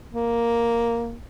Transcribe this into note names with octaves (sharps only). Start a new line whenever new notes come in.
A#3